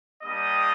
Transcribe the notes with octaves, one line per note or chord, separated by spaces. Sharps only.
G3 A#3 D4 G4 D#5 D#6